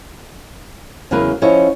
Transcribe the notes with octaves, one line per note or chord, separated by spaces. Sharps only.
E2 C#3 F#3 A#3 A#4 B4
F3 C#4 D#4 E4 C#5